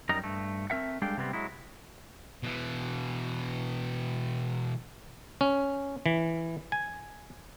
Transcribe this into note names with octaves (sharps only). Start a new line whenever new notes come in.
F#2 G3 D#4 A#4 D#5 A#5
G2 A3
A3 C4 A#4 E5 F#5
G3 G#3 D4 A4 F5 G5
C3 G3 B3 C4
F#3 G#3 E4
B2 E3
C#4
E3
G#5